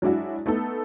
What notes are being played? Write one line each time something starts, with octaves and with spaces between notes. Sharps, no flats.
F#3 G#3 D4 E4 F#4
A3 B3 D#4 A4